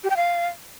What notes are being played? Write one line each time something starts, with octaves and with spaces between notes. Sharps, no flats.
G4
G5
F5